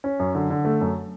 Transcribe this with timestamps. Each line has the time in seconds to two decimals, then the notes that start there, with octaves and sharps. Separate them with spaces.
0.04 C#4
0.19 F#2
0.35 D3
0.50 D3
0.65 A3
0.81 F#2